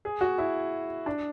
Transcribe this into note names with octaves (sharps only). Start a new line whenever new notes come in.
G#4
F#4
E4
D4